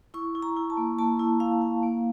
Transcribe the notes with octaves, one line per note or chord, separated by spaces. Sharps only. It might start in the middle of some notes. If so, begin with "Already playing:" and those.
E4 C#6
E4
A#5
E4
A5
A#3
A#3 A5
E4
E4 F5
E4
A#3